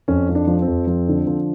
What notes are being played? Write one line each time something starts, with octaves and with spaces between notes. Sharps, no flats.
F2 C#4
F3
D4
F3
C4
F2
F3
D3
F3